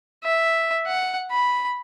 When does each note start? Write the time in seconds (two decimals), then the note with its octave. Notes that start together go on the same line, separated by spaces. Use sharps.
0.24 E5
0.87 F#5
1.31 B5